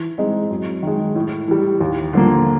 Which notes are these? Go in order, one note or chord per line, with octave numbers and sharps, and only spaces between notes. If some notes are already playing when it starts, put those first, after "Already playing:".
Already playing: E3
G#3 C4 D#4
F#2
D#3 G#3
A2
E3 G3
D#2
D3 F3 A#3